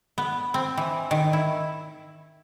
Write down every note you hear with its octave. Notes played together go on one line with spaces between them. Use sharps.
B3
C4
E3
D#3
E4